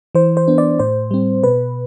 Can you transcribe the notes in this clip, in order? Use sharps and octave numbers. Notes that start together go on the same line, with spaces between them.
E3 C5
C5
B3 D4
D5
A2 C5
G3 C4
B2 B4